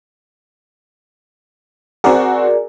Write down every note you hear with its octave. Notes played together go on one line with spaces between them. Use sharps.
C4 F#4 G#4 A#4 D5